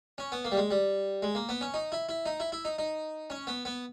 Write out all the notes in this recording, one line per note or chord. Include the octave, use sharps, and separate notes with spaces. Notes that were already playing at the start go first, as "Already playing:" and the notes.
C#4
B3
A#3
G3
G#3
G3
G#3
A#3
B3
C#4
D#4
E4
E4
D#4
E4
E4
D#4
D#4
C#4
B3
B3